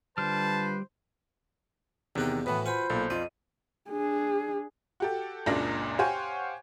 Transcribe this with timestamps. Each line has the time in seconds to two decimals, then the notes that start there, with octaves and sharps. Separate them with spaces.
0.18 D3 G3 F4 B4 C5 A5 F6
2.16 E2 C3 D#3 D#4 G4 F#6
2.46 A2 E3 B3 F#4 B4
2.66 F4 C5 F#5 G#5 B5
2.90 B1 A#2 A4 A5
3.10 F2 F4 D5 D#5
3.90 D4 G#4
5.00 F#4 G4 A4
5.46 F#1 C#2 F#2 A#2 D4 A#6
5.99 G4 C5 C#5 F5 F#5 G#5